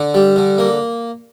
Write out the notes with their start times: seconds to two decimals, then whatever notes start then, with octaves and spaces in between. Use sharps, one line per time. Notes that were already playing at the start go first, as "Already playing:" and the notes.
Already playing: D3
0.14 G3
0.36 D3
0.58 A#3